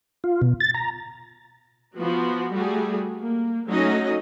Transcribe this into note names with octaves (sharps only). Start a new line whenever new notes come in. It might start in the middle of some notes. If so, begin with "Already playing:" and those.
F4
B2
A6
A#5
F3 B3 F#4
G3 A3 F#4 G#4
A#3
F#3 A3 C#4 D#4 F#4 D#5